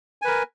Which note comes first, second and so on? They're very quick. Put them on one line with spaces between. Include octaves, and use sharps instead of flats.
G#5 B4 A#4